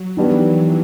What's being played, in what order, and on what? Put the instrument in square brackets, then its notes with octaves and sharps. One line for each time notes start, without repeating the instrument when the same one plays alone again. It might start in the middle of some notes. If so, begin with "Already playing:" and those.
Already playing: [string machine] F#3
[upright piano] D#3 G3 B3 D4 [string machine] E3